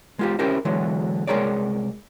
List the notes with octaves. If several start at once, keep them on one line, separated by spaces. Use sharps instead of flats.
G#3 F4 G4
C#4 E4 G4 A#4 C5
D3 E3 F#3 G#3
C2 G#3 G#4 A#4 C#5 D5